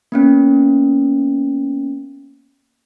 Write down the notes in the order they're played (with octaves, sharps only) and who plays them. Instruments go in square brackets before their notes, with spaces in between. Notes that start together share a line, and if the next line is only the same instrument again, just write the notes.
[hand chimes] A#3 B3 C#4